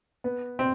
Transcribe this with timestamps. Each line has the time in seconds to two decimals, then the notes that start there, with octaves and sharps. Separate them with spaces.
0.24 B3
0.59 C4